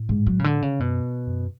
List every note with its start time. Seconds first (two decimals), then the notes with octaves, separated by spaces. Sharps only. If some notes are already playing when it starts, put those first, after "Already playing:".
Already playing: A2
0.09 G#2
0.27 F#3
0.39 C#3
0.44 D3
0.62 C#3
0.80 F#2 B2
1.27 F#2